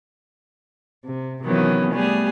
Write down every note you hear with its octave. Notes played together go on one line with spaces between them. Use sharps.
C3
C3 D#3 E3 F#3 B3 C#4
G3 A3 B3 G4 G#4